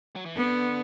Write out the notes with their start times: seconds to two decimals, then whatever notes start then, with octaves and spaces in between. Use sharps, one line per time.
0.16 F#3
0.26 E3
0.36 D3 B3